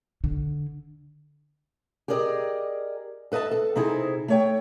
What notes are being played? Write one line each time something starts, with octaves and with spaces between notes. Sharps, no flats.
D3
G4 G#4 A#4 D5 D#5
A4 B4 D#5 E5 A5
A4
C3 C4 D#4 E4 G#4
A3 C#5 G5